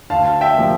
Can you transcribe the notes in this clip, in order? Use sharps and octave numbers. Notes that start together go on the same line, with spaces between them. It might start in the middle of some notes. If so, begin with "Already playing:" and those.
D2 F5 A5
E5 G5
C3 F3 A#3